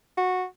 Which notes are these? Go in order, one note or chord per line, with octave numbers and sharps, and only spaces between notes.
F#4